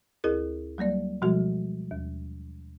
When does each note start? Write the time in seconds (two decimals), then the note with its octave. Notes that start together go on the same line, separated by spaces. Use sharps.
0.24 D2 E4 G#4 A#4
0.78 F#3 G3 A#3 D5
1.22 B2 F3 G3 G#3 F#4
1.91 D#2